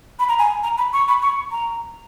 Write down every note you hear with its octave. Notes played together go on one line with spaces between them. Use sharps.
B5
A#5
G#5
A#5
B5
C#6
B5
C#6
A#5